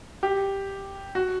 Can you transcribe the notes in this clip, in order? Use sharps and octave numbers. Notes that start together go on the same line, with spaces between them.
G4
F#4